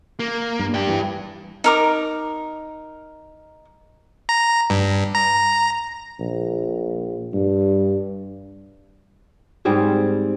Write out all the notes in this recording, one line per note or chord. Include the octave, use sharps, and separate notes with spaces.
A#3
G2
D4 G4
G2 E3
D#4 A#4 D6
A#5
G2
A#5
A#1
G2
G#2 G3 C4 G#4